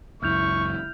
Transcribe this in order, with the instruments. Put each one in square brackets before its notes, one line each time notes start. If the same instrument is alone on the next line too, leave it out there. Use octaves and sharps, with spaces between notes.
[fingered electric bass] C#2 F#2 [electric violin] E4 [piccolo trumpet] C#6 [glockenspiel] F6 G6 F7